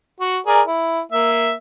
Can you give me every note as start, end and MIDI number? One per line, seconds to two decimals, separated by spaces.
0.21 0.38 66
0.47 0.62 68
0.47 0.62 70
0.47 0.62 74
0.67 1.00 64
1.12 1.53 58
1.12 1.53 76